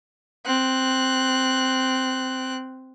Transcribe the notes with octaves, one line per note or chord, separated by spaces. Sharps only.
C4 F#6